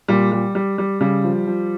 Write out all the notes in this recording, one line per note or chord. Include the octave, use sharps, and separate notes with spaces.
A#2 G3
G3
G3
G3
C#3 G3
F3
F3